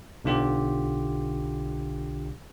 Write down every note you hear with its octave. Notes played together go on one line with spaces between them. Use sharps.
B1 D3 F4 G4